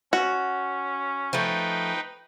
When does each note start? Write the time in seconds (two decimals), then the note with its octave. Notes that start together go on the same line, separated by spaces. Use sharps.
0.13 C#4 F#4
1.33 F3 A3 D#4 B4 G5